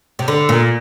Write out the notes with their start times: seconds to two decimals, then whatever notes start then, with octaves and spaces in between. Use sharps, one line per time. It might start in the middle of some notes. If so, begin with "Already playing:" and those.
0.19 C3
0.28 D3
0.49 A#2